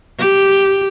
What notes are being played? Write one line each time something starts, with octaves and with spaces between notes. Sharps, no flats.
G4